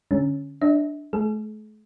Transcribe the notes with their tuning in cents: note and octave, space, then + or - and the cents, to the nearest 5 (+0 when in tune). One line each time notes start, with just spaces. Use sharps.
D3 +0 G#3 +0 C#4 +0
D4 +0 E5 -40
A3 -40 G#4 +45